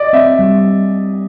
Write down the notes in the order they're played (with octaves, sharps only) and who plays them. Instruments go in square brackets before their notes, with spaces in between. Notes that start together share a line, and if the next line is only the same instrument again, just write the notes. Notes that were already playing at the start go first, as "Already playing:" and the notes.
Already playing: [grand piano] D5 D#5
[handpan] C4 [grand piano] E5
[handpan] G3